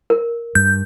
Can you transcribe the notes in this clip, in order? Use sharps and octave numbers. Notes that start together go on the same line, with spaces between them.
A#4
G2 G6